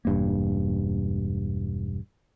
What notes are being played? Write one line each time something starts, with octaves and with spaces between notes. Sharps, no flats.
E1 G2 A#3